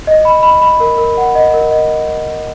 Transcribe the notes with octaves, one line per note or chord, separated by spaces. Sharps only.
D#5
B5
B5
B5
A#4
A#4
F#5
D#5
A#4
D#5